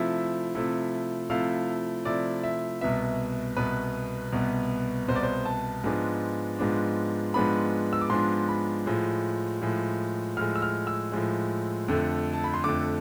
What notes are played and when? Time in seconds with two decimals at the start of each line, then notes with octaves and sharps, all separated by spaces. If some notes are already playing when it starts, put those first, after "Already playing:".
Already playing: C3 F3 A3 E4 E5
0.55 C3 F3 A3 E4
1.30 C3 F3 A3 E4 F5
2.05 C3 F3 A3 E4 D5
2.44 E5
2.81 C2 B2 B3 E5
3.57 C2 B2 B3 B4
4.32 C2 B2 B3
5.08 C2 B2 B3 C5
5.16 D5
5.23 C5
5.46 A5
5.84 G#2 F3 G#3 B3 D4
6.59 G#2 F3 G#3 B3 D4
7.34 G#2 F3 G#3 B3 D4 B5
7.93 E6
8.01 D6
8.10 G#2 F3 G#3 B3 D4 C6
8.49 B5
8.86 A2 F3 G#3
9.62 A2 F3 G#3
10.37 A2 F3 G#3 F6
10.56 E6
10.62 F6
10.87 E6
11.12 A2 F3 G#3
11.88 F2 D3 A3
12.33 A5
12.44 B5
12.54 C6
12.64 F2 D3 A3 D6